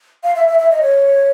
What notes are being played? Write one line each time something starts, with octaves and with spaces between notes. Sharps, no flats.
F5
E5
E5
E5
D#5
C#5